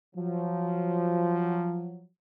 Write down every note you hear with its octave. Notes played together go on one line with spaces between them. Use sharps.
F3 F#3